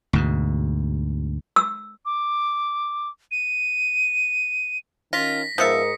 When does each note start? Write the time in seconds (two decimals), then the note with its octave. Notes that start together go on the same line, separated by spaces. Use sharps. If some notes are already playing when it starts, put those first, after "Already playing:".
0.13 D2 G#2 B2
1.56 E6
2.05 D6
3.31 D#7
5.13 D#3 C#4 F4 A#6 B6
5.58 G#2 F3 B3 A#4 E5 D#6 C#7